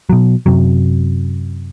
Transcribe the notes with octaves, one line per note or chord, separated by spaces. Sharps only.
B2 F#3
F#2 C3 F#3